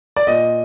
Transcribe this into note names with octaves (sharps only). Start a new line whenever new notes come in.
D5
A#2 D#5